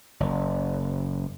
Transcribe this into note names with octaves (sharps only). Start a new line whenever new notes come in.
F#1